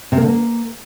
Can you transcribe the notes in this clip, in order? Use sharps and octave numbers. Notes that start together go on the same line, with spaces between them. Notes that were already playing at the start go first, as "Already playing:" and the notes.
C3
A#3
D3
A#3